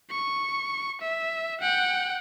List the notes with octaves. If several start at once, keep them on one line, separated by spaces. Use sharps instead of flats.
C#6
E5
F#5 G5